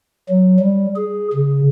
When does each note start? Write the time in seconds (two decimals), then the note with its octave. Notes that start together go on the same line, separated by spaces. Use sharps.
0.29 F#3
0.60 G3
0.96 G#4
1.34 C#3